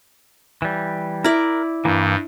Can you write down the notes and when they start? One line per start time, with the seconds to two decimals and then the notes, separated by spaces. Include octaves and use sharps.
0.62 E3 G3
1.24 E4 A#4 D5
1.85 G2 E3 A#3